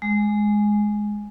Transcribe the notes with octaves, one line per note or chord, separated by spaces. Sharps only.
G#3